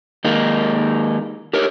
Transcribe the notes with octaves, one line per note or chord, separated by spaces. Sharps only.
D#3 G#3 A#3 D#4
G4 A#4 C#5